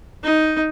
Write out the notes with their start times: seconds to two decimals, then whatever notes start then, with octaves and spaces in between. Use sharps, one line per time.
0.23 D#4